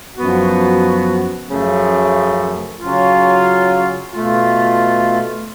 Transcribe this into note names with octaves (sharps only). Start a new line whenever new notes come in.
F#2 F3 B3 F#4
F#2 C#3 F3 A3
C#3 F#3 C#4 F4
B2 A3 F4